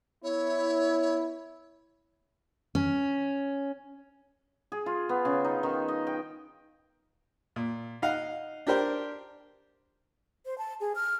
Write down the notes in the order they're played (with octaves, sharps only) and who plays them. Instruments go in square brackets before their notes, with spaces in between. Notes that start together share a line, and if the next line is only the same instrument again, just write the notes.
[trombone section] B3 E4 [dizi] C#5
[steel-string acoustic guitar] C#4
[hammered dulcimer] G#4
F4
B3
C#3
D#4
D#3
D#5
G5
[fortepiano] A#2
D#4 F5 F#5
D4 G4 A#4 C5
[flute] C5
A5
G#4
F6